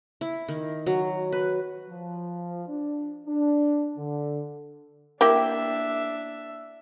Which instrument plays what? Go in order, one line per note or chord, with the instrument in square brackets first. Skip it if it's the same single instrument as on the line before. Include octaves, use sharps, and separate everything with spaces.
[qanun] E4
D#3
F#3
B4
[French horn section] F3
D4
D4
D3
[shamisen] A#3 E4 G4 [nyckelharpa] D4 E5